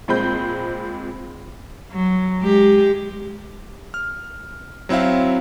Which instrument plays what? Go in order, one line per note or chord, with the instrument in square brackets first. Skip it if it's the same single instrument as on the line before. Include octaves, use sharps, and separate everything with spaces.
[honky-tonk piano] A#2 G#3 C4 B5 G6
[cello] F#3
G#3 G4
[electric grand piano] F6
F#3 C4 E4 E5 F5